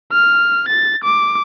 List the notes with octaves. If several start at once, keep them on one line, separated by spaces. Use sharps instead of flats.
F6
A6
D6